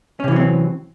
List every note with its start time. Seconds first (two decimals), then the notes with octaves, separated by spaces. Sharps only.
0.20 C#4
0.24 C3
0.28 E3
0.32 F#3
0.36 C4